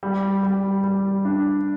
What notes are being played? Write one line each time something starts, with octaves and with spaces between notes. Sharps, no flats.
G3
G3
G3
D4